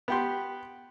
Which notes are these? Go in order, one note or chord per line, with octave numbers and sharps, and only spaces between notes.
B3 G4 C6